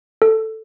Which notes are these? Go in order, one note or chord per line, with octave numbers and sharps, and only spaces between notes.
A4